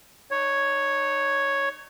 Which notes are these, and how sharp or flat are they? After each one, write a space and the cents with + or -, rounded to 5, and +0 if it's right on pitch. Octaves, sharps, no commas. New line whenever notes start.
D#4 -35 C#5 +0